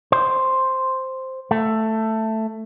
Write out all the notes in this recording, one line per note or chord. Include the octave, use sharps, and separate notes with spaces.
C5
A3